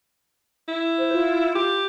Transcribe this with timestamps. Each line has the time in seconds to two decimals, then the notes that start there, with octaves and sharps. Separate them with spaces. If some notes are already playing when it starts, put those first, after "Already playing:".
0.68 E4
0.99 C5
1.13 F4
1.55 G4